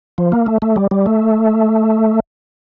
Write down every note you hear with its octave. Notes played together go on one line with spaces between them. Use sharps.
F3
A#3
A3
A3
G3
G3
A3